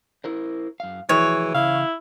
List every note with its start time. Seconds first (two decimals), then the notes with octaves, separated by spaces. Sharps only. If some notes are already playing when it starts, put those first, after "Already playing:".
0.24 E4 A#4 C5
0.80 F#2 F5
1.09 E3 F3 F#4 G#4 C#5
1.54 C#3 E3 E4 F5